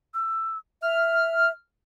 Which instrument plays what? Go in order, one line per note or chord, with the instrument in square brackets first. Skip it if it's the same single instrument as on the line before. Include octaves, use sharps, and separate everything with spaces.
[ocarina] E6
[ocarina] E5 [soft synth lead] F6